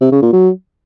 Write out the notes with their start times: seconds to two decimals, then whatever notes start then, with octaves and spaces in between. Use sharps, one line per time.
0.01 C3
0.12 C#3
0.22 A#2
0.33 F#3